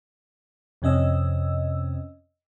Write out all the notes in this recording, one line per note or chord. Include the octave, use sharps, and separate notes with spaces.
F2 C3 C#4 D#5 E6